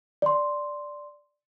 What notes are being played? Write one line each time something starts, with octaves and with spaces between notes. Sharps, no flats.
D5 C6